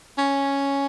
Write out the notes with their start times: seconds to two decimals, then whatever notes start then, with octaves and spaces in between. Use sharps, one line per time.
0.18 C#4